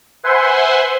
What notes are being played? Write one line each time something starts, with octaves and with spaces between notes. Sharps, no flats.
B4 C5 E5 F#5 G#5 C6